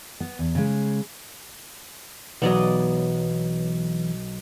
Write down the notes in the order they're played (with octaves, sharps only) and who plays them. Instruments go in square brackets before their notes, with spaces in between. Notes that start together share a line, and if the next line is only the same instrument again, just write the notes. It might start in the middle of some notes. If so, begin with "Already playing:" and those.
[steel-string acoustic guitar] B3
E2
C#3 G#3
[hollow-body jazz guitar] B1 F#3 [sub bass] E3 [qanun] B3 D5 D#5